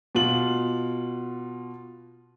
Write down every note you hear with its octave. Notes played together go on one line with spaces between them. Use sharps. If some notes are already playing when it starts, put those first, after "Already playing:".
B2 F4 F#7